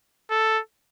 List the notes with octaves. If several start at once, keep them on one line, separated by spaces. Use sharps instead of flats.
A4